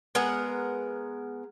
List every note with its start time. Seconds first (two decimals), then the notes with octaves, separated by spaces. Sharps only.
0.15 G#3 B3 A#4 F#5